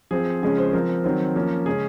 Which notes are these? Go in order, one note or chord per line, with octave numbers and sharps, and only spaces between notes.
F3 C4 G#4
C#3 F3 G#3 C#4 G#4
C5
F3 C4 A#4
D#3 F#3 C4
F3 A#3 C#4
C#3 G#3 C#4 G#4